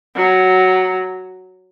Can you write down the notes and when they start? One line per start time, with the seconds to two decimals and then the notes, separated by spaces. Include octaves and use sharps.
0.16 F#3